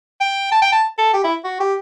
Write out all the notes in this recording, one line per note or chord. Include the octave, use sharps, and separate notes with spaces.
G5
A5
G5
A5
A4
G4
E4
F#4
G4